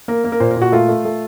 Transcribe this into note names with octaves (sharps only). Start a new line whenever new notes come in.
A#3 A#4
A#3
A#4
A#2 C5
A#4
A#2
F#4
A3 F4
A3
A3